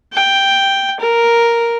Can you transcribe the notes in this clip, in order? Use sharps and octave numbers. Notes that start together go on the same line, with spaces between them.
G5
A#4